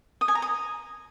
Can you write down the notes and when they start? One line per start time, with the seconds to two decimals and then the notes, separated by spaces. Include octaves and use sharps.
0.21 D#6
0.28 G#5
0.35 A#5
0.42 D#6